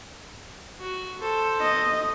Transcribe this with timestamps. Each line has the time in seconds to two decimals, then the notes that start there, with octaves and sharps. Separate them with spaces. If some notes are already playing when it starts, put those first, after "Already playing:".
0.79 F#4
1.20 A4 C5
1.61 D#5